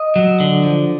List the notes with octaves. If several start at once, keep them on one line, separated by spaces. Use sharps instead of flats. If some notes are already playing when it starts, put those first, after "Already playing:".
Already playing: D#5
F#3
D3
F3